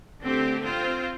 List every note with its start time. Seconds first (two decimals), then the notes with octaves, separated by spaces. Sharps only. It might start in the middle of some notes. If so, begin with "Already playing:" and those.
0.22 D3 A3 C4 G4
0.63 C4 F4 C5